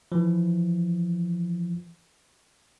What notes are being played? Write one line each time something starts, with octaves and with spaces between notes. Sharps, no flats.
E3 F3